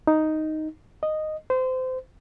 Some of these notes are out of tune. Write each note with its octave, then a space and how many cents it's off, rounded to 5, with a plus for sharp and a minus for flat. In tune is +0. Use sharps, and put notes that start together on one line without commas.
D#4 +0
D#5 -5
C5 -25